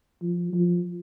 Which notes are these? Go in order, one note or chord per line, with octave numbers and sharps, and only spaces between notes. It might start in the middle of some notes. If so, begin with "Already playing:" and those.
F3
F3